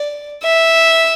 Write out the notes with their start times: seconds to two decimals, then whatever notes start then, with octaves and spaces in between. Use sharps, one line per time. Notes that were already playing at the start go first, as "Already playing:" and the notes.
Already playing: D5
0.43 E5